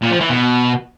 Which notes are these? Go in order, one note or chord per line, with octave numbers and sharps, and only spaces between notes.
A#2
F3
E3
B2